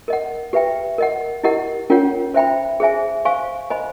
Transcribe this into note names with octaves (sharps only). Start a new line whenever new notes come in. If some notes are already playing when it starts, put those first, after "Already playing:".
A#4 D#5 F#5
G4 B4 E5 G5
A#4 D#5 F#5
E4 G4 A#4 D#5 F#5
C#4 F4 A#4 C#5 F#5
C5 E5 G5 B5
G#4 C5 E5 G#5
C5 F5 G#5 C#6
C5 D#5 G#5 B5